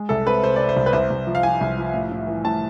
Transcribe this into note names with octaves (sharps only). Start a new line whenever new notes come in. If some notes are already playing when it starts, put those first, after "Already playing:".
Already playing: G#3
C2 A4
C4 B4
C3 C5
C4 D5
C5
C2
B4
C2 C5
C2
F3
F5
F3 G#5
C2
F3
A2
A2
E3
A2 A5